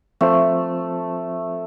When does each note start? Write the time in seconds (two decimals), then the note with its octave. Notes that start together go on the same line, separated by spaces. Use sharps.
0.21 F3 A3 C4 F4 C5